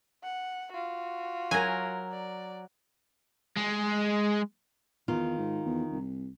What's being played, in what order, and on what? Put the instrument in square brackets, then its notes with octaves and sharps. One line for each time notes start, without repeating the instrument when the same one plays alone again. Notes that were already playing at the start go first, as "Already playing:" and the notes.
[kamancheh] F#5
F4 F#4
[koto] F#3 A#4 [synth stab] G#5
[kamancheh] D5
[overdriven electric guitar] G#3
[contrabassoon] E2 [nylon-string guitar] D#3 D#4 F4
[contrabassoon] G#2
E2
C2